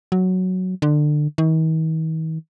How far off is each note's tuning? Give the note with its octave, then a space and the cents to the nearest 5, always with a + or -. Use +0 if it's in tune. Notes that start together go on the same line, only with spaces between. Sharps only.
F#3 +0
D3 +25
D#3 +45